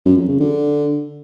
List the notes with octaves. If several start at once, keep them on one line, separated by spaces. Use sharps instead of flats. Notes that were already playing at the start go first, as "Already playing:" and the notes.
F#2
F2
C#3
D3